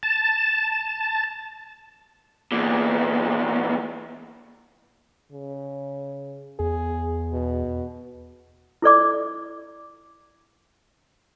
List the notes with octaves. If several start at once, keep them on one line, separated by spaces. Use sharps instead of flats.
A5
E2 A#2
C#3
E2 G#4
B2
E4 A4 D5 D6